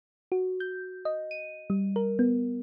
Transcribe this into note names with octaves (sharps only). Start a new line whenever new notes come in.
F#4
G6
D#5
D#7
G3
A#4
B3